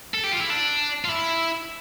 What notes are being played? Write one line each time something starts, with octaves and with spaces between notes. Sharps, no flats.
A4
G4
F4
E4
D4
F4
E4